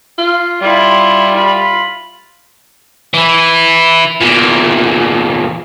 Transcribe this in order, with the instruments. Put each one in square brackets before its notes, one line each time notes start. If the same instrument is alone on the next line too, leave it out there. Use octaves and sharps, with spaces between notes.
[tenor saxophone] F4
[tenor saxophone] G3 [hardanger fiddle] E4 F4
[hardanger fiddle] F4 B5
[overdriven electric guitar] E3 E4
E2 A#2